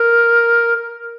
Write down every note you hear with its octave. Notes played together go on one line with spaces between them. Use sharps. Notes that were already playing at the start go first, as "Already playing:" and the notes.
Already playing: A#4